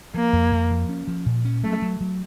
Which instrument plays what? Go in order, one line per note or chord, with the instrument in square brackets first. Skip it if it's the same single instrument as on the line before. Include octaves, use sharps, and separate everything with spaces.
[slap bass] F3 [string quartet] A#3
[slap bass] F2
F2
F3
C#4
F3
A#2
C#4
[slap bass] F#3 [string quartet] A3
[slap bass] F#3
F#3